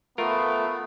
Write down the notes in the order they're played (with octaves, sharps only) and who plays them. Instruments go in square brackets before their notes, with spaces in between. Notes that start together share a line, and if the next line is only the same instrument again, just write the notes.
[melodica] A3 [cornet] B3 [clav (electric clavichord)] F4 A#4